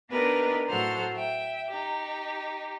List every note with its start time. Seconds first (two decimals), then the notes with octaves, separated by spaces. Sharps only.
0.11 B3 D4 D#4 G4 A#4 B4
0.69 A2 F#3 A4 C5 F#5 F6
1.15 E5 G5
1.69 D#4 G4